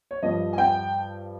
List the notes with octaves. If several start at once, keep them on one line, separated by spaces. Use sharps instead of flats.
C#5
G2 F3 D#5
G#5
G5